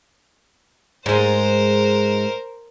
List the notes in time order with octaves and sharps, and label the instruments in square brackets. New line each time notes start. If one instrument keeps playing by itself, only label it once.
[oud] G#2 G#3 [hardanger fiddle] A#4 C5